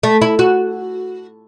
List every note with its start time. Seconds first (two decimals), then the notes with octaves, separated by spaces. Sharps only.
0.03 A3
0.22 E4
0.39 F#4